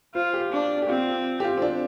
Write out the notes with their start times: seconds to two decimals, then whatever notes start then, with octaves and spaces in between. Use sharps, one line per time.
0.14 F4 C5
0.34 G4
0.52 D4
0.82 G4
0.88 C4 F4
1.40 G4
1.44 F4
1.58 C4
1.62 D4